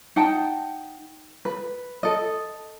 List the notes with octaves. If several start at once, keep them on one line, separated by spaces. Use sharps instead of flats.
D#4 F#5 G5 A5
B4
A4 D#5